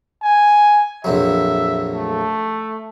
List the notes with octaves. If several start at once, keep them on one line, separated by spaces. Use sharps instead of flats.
G#5
A#1 F2 F#3 E5
A3